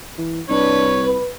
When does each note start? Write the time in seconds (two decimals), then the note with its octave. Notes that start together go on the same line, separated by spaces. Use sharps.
0.18 E3
0.49 C2 D4 B4 C#5
1.05 B4